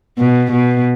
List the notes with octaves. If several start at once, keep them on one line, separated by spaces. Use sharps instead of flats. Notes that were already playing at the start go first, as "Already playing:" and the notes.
B2
B2